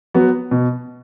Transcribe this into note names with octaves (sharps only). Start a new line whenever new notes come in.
F#3 B3 F#4
B2